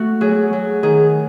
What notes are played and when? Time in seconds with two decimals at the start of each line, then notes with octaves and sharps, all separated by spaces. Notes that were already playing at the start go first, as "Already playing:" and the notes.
Already playing: A3 F#4
0.21 F#3 G#4
0.53 F#3
0.83 D#3 G#4